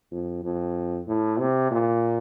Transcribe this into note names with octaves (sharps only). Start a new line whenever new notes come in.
F2
F2
A2
C3
A#2